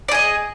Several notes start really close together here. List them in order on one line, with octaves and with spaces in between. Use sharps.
D5 G#4 D#5